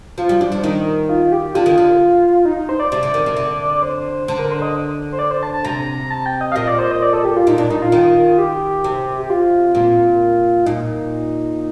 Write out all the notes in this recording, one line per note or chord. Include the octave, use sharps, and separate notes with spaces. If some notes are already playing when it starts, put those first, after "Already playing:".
F3 F4
G3
G3 D4
F3
D#3 D#4
F4
G4
D3 F4
D#3
D3
D#4
D#4
C5
D5
C3 D5
D3
D#3
C3
D3
C5
D3 C5
A#4
C5
D#5
C5
D5
C5
A5
A5
C3 A#5
A5
G5
D#5
F5
A#2 D#5
D5
C5
D#5
D5
A4
G4
F4
A#2 D#4
A#2 D4
A#2 D#4
F4
D#3
G4
C3
G4
F4
A#2 F4
A#2 D#4